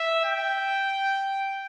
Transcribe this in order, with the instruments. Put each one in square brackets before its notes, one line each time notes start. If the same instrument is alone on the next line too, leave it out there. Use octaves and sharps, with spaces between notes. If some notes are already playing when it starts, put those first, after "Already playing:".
Already playing: [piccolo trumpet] E5
G5